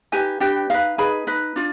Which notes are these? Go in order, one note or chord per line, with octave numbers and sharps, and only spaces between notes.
D#4 G4 B4 G#5
D4 G4 B4 G5
D#4 B4 F5
D#4 G#4 B4 B5
D#4 B4
D4 F4